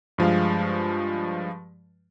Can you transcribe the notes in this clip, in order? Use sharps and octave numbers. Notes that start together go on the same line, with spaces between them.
G2 F3 G#3 F5